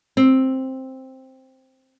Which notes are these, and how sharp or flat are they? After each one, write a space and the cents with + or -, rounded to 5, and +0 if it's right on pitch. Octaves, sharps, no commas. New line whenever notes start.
C4 +5